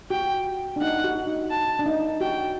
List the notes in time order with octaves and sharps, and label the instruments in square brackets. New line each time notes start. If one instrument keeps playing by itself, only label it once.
[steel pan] F#4 [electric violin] G5
[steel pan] D4
[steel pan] D#4 [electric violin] F#5
[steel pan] F#4
D#4
[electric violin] A5
[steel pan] D4
D#4
[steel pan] F#4 [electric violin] G5